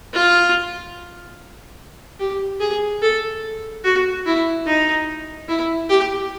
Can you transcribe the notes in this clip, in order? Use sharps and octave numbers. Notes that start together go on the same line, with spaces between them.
F4
G4
G#4
A4
F#4
E4
D#4
E4
G4